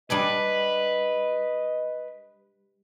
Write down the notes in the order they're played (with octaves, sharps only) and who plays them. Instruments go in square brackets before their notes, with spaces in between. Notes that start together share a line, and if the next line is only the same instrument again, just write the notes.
[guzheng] G3 D4 G#4 [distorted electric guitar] B4 [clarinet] D#5